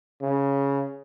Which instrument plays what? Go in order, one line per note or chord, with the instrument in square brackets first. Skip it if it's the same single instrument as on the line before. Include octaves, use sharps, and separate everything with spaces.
[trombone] C#3